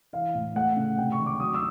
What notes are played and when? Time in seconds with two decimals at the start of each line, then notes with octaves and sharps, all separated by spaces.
0.13 E3 F5
0.35 A2
0.55 A3 F#5
0.76 C#3
0.98 C3 G5
1.12 C#6
1.19 D#3
1.26 D6
1.40 F#3 D#6
1.54 E6